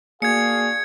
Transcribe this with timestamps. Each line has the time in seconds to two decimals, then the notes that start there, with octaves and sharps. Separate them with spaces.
0.22 A#3 D4 F#4 G#4 F5 G#6 C#7